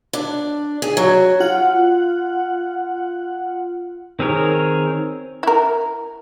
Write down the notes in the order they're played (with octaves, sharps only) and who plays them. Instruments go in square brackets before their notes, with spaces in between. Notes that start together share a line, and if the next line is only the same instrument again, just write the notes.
[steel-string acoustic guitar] D4
G#4
F#3
[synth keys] F4 F#5
[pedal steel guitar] D#3 C4 G#4 A#4 C#5
[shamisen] E4 A#4